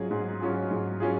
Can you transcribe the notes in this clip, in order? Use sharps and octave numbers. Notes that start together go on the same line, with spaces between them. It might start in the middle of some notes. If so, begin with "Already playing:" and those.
Already playing: G#2 F#3 C#4 F4 G#4
G#2
F#3 C#4 F4 G#4
G#2
F#3 C#4 F4 G#4